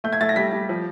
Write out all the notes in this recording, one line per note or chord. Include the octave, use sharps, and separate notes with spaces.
A3 G6
G#6
A3 A6
A#6
G3 B6
G3
F3